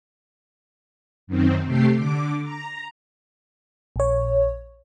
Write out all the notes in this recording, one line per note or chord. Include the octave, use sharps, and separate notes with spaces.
F#2 D#3 C4
C3 A3 G4 C7
D3 D6
A#5
A#1 C#5